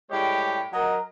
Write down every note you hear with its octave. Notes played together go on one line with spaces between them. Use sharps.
A2 G3 G#3 G4 C#5
F#3 A#4 D#5